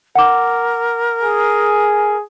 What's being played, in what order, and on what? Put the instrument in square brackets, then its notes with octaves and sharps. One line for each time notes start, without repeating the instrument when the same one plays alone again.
[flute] A#4 [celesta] F#5 D6
[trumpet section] G#4